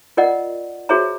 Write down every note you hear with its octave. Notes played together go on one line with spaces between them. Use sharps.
F4 A#4 D5 D#5 F#5
F#4 G#4 C5 C#5 E5 A#5